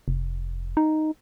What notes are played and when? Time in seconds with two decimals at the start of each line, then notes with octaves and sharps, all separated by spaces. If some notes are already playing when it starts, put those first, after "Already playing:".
0.08 F1
0.77 D#4